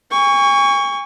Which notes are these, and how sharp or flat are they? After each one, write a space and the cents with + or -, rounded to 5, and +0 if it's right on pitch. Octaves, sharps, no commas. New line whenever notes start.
G#5 -40 C#6 +15